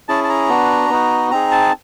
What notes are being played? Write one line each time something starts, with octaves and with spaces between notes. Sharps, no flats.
C#4 E4 G#4 A5
A5
A#5
B3 D4 F#4
B3 D#4 F#4
C4 D#4 G#4 A#5
A5